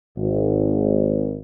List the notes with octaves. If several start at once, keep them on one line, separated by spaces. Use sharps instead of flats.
G#1